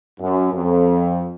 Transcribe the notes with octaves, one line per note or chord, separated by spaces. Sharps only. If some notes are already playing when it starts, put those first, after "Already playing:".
F#2
F2